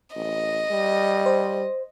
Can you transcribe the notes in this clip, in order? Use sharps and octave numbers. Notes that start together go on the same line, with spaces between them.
A1 D#5
G3
C5